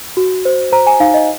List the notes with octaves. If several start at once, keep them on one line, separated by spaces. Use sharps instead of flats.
F#4
C5
C5 A#5
G#5
D#4 F5
D#5